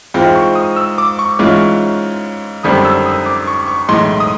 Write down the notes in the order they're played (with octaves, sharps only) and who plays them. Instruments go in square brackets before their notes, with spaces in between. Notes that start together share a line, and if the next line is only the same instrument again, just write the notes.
[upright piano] G#2 E3 G#3 C4 F4
[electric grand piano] C#6
D#6
E6
D6
C#6
[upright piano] G#2 E3 G#3 C#4 F4
[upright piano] G#1 F#2 D3 G3 C4 [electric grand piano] D#6
[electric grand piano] E6
D#6
D6
C#6
C#6
[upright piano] B1 A2 E3 G#3 [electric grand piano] C6
[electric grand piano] D#6